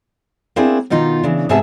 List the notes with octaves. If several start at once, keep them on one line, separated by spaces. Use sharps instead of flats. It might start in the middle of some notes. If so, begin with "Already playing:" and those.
A#3 C4 D4 E4 G#4
B2 D#3 D#4 F4
C#3 E3 D4
G#2 C3 B3 G#4 E5 A5